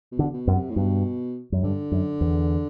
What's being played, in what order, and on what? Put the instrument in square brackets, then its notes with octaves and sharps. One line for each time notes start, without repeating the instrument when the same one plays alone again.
[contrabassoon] B2
[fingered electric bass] D3
[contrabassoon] B2
[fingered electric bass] F#2
[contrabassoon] C3
A2
[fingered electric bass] G2 [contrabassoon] B2
[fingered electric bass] F#2
[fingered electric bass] G2 [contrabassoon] D3
[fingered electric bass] F#2
E2